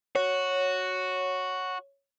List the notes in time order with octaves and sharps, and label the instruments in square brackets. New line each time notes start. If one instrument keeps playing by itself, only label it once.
[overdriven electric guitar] F#4 [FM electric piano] C#5